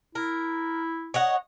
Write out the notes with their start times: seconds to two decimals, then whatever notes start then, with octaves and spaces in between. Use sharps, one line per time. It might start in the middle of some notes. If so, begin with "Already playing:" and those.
0.15 E4 A#4
1.14 C#5 D#5 F#5